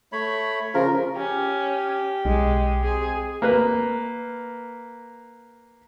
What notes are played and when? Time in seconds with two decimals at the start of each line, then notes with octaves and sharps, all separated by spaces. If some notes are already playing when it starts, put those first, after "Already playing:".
0.12 A3 C#5 B5
0.74 C#3 F3 A#4
1.16 C#4 G4
2.25 B1 G#3
2.84 C4 G#4
3.42 A#3 B4